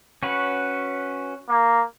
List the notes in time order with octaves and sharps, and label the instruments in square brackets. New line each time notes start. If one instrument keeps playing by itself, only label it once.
[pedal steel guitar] C#4 F#4 B4
[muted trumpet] A#3